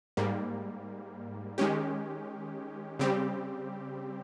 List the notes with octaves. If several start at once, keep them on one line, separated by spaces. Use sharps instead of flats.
G#2 G3 A#3
D#3 G#3 C#4 G4
C#3 G3 C4 G4